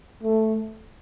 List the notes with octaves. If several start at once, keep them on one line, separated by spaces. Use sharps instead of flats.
A3